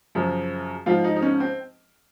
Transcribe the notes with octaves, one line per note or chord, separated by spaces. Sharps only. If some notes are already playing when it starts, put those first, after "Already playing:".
F#2 C#3 F3
G#2 F3 F4
D#4
D#4
C#4
C4